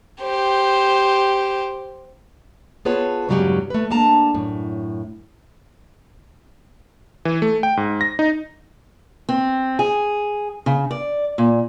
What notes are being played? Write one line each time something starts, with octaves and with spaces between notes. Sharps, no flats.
G4 C5
B3 F4 G#4 B4 C#5 A5
E2 G2 C#3 F#3 G#3 G4
A3 B4
A#3 D4 A5 A#5
F#2 A2
E3
A3
G5
G#2
A#6
D#4
C4
G#4
C#3
D5
A#2